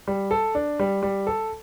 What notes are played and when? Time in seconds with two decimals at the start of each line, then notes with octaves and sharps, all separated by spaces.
0.08 G3
0.31 A4
0.55 D4
0.80 G3
1.03 G3
1.27 A4